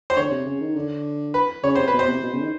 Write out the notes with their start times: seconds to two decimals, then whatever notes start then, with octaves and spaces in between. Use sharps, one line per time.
0.10 C5
0.17 D3 C#5
0.31 C3
0.46 C#3
0.60 D#3
0.76 D3
1.34 B4
1.64 C#3 C#5
1.75 C3 C5
1.88 B4
1.93 B2
1.99 C5
2.08 C3
2.23 B2
2.33 C#3
2.42 D#3